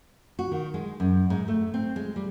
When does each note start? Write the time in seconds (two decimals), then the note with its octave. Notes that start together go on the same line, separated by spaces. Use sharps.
0.39 F#4
0.52 D#3
0.74 G#3
1.00 F#2
1.30 G#2
1.48 A3
1.74 C4
1.96 G#3
2.16 G3